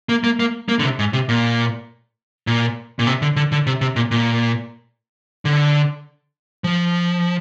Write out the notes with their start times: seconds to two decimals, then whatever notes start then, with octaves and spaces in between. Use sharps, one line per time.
0.09 A#3
0.24 A#3
0.40 A#3
0.69 A#3
0.80 D3
0.83 C3
0.99 G#2
1.13 C3
1.29 A#2
2.47 A#2
2.99 A#2
3.07 C3
3.22 D3
3.36 D3
3.52 D3
3.67 C3
3.81 C3
3.96 A#2
4.11 A#2
5.45 D3
6.64 F3